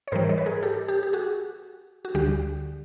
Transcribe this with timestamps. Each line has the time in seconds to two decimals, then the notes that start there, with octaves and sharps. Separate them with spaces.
0.08 C#5
0.12 G#2 E3 G3 A#4 C5
0.29 C#5 D#5
0.38 B4
0.46 G#4 A#4
0.63 G4 A4
0.88 G4
1.03 G4
1.13 F#4 G#4
2.05 F#4
2.15 D2 D3 G3 G4